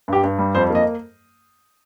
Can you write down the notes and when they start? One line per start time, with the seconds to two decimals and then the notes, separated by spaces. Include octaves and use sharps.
0.08 G2 G4
0.23 G2
0.39 G3
0.55 F2 C5
0.70 A#3 D#5